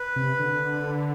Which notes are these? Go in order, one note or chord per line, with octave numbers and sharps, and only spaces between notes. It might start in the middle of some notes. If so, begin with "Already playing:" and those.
Already playing: B4
C3
D3